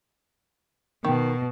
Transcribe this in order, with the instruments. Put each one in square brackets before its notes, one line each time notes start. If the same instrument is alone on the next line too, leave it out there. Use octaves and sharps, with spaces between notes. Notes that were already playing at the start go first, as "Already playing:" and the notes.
[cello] B2 [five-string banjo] D#3